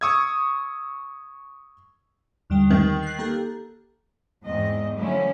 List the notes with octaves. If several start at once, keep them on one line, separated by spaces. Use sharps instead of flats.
C#6 D#6 E6 G#6
D#2 D3 G3
D#3
F#6 C7
A#3 G4 A4
E2 G#2 C4 D#5
D3 F3 F#3 A3 C#4 E4